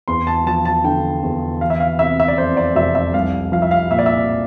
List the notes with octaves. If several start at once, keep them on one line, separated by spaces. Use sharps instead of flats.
E2 C6
A5
F3 A5
A5
D3 G5
E2
E3 F5
E5
F5
C3 E5
E5
D5
F2 C5
D5
F1 E5
E5
C2 F5
F3 F5
E5
F5
A#2 E5
D5
E5